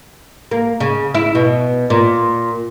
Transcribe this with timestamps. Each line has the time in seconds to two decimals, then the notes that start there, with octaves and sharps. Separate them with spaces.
0.51 A#3
0.80 C#3
1.14 E4
1.35 B2
1.90 A#2